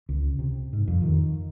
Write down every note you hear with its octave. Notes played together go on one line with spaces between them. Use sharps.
C#2
C3
G#2
F2
D#3